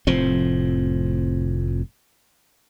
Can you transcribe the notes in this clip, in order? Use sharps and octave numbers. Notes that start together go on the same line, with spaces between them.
F1 A2 F3 C4